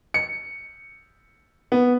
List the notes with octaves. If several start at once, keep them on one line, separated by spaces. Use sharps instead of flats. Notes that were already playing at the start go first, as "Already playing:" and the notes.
C#7
B3